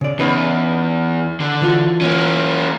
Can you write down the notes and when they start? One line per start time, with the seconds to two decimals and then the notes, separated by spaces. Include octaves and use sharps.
0.01 C#3 D5
0.19 E2 C#4 D#4 B4
1.40 D3
1.62 E3 F4 F#4
2.01 A#3 C#4